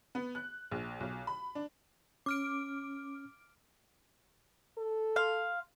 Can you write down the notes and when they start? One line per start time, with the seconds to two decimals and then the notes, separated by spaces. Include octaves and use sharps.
0.15 B3
0.35 F#6
0.71 A#1
1.00 B1
1.27 B5
1.55 D4
2.26 C#4 D6 F6 D7
4.78 A4
5.16 F5 C6